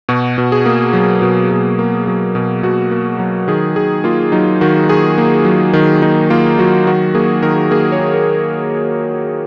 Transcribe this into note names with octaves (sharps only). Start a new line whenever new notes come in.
B2 F#4
B2
G#4
A#3
F#3
B2
B2
A#3
F#3
B2
B2 F#4
A#3
F#3
D#3 G#4
D#3 G#4
A#3 F4
F#3 D#4
D#3 F#4
D#3 G#4
A#3
F#3
D#3
D#3 D#4
A#3 F4
F#3 F#4
D#3 F#4
A#3 G#4
D#3 A#4
A#3 G#4
C#5
D#3
A#4